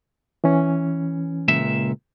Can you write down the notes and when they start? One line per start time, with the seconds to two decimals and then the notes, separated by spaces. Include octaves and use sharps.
0.44 E3 C#4
1.48 C#2 A#2 E5